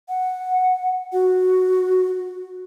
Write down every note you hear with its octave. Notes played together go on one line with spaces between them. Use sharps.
F#5
F#4